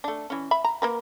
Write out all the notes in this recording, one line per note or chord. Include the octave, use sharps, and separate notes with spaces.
A3 D4
E3 C#4
E5 B5
A#5
A#3 A#4 B4